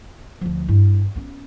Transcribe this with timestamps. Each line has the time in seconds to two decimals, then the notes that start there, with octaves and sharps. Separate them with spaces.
0.41 D2 F3
0.68 G2 E4
1.16 B3 C#4